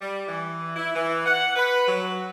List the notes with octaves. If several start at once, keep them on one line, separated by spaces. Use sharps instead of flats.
G3
E3
E4
E3
F#5
B4
F#3